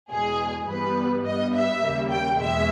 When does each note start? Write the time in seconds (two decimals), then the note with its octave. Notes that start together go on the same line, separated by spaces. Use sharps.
0.11 E2 B2 G#3 G#4
0.68 G2 E3 G3 B3 B4
1.25 G2 G3 B3 D#5
1.53 E5
1.82 D#2 C#3 G3 A#3
2.10 G5
2.39 E2 B2 G#3 E5